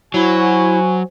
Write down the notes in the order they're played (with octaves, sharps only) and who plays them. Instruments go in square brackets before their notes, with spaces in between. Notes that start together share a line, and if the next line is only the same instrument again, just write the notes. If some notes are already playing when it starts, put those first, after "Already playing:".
[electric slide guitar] F#3 [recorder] E4 [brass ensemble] F#4 C5 G#5